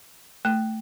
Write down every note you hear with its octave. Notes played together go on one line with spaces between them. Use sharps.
A3